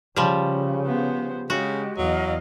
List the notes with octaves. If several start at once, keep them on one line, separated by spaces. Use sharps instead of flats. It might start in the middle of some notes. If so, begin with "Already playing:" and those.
C#3 F3 G3
B3 C5
C#3 G#3 F#4 G4
E2 F#3 D#5 F5